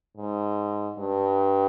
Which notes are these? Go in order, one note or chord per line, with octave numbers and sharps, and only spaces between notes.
G#2
G2